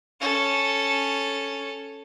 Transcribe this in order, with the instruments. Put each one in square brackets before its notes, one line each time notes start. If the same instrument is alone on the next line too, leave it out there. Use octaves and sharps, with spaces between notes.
[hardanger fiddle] C#4 A4